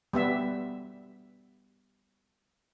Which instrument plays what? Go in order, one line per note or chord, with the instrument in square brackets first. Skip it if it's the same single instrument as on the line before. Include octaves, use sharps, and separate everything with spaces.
[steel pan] G3 B3 E5